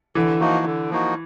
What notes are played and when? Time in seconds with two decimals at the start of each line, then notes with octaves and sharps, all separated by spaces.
0.15 D3 E3
0.40 F3 A#3 D#4 F#4
0.65 D3
0.90 F3 A#3 D#4 F#4